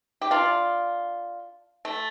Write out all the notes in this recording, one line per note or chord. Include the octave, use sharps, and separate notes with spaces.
G4
D4 F4
A3